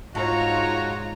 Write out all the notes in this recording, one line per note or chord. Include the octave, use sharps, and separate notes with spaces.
G#2 D4 D#4 F4 F#4 C#5 A#5